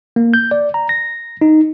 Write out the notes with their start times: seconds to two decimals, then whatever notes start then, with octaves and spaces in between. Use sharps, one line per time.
0.16 A#3
0.34 G6
0.51 D5
0.74 A#5
0.89 A#6
1.41 D#4